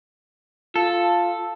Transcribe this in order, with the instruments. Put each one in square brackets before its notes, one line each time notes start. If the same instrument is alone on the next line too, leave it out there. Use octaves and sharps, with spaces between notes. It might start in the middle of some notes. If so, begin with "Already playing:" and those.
[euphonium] F4 [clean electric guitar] A4